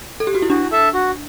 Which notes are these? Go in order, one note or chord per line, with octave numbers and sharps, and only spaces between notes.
A4
G4
F#4
E4
D4 F#4
A4 E5 A5
F#4